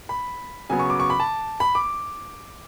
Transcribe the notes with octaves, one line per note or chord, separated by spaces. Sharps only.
B5
C#3 F#3 B3 G#5
C#6
D6
C#6
B5
A5
B5
D6